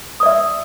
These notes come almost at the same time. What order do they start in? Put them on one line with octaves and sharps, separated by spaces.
D#6 D5 E5 E6